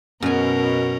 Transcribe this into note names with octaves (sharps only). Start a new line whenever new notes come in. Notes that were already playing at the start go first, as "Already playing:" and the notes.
F#2 B2 C#4 A#4 G#5